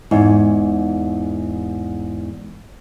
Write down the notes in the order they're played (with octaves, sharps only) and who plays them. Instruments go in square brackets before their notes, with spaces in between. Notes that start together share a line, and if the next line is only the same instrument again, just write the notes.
[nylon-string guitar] E2 G#2